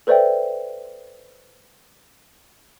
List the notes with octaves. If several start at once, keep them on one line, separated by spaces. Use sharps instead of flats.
A4 B4 C5 D5 E5 G5